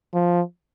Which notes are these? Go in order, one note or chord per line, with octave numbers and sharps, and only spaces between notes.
F3